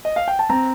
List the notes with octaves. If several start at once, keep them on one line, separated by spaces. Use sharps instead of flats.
D#5
F5
G5
A5
C4 A#5